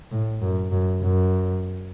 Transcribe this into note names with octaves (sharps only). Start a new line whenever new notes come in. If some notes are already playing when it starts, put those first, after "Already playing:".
A2
F#2
F#2
F#2